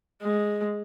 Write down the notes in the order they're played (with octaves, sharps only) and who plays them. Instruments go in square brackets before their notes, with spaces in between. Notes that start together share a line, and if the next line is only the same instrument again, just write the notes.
[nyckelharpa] G#3